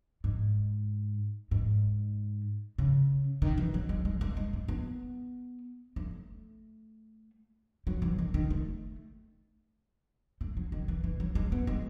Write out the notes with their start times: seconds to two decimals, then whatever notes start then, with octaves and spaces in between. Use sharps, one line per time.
0.24 G#2
1.51 G#2
2.78 C#3
3.42 D#3
3.58 E3
3.74 F#3
3.89 G#3
4.05 G#3
4.21 A3
4.37 G#3
4.53 A3
4.68 B3
5.96 A3
7.87 F#3
8.02 E3
8.19 D#3
8.34 D#3
8.50 A3
10.41 A3
10.57 F#3
10.72 D#3
10.88 E3
11.04 E3
11.20 F#3
11.35 G#3
11.52 B3
11.67 G#3